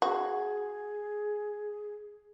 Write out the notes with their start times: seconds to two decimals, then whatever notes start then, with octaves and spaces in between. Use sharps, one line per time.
0.02 F#4 G#4